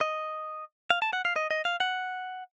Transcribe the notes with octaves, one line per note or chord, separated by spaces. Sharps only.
D#5
F5
A5
F#5
F5
D#5
D#5
F5
F#5